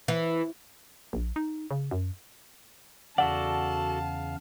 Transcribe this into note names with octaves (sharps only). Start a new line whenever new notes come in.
E3
A#1
D#4
C#3
F#2
E2 C#3 F#4 A4 D5 F5 F#5 A5